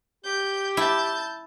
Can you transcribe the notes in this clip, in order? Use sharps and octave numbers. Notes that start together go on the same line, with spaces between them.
G4 G6
E4 A5 G6